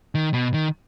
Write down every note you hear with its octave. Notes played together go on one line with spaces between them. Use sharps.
D#3
B2
D#3